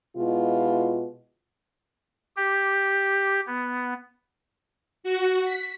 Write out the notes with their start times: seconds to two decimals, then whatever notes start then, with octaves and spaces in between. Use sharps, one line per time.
0.17 B2 G#3 E4 F4
2.37 G4
3.47 B3
5.04 F#4
5.45 B6